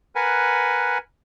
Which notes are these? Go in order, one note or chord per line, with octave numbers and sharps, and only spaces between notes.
A#4 B4 F#5 G#5